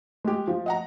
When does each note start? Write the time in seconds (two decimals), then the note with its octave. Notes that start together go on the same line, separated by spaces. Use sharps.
0.25 G#3 G4
0.47 F3
0.66 D#5 F#5 A#5